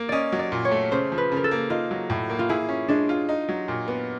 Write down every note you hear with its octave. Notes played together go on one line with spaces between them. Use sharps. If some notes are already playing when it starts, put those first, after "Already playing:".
Already playing: A#3
C#4 D5 D#5
F#3
D5
A#2
C#5
A3
C#3 C5
F3
B4
C#3
A#4
A4
A#3
D#4 F4
F#3
A2
A#3
F4
E4 G#4
C#4
G#3 D4
F4
D#4
F#3
A#2
B3